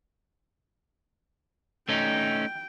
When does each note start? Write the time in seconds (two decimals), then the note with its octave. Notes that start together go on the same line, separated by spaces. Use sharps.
1.89 A3 C#4 D#4 G5